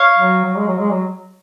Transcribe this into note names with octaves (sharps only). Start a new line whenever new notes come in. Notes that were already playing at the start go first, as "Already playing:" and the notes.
Already playing: C#5 F5
F#3
F#3
G#3
F#3
G#3
F#3